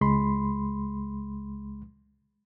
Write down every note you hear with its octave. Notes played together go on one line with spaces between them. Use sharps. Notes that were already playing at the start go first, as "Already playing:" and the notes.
C#2 G#3 B5 C6